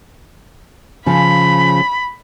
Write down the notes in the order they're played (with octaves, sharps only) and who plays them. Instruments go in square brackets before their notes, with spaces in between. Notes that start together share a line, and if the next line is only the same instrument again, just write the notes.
[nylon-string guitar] C#3 F3 [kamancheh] B5